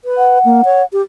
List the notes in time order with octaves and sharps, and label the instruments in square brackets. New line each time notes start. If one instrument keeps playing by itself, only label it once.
[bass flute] B4
[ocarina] F#5
[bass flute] A#3
C#5
G4